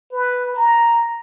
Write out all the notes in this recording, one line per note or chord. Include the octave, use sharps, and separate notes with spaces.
B4
A#5